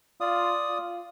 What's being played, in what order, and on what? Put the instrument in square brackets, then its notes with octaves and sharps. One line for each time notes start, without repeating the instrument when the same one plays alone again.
[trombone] F4 [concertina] D5 D#6
[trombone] F4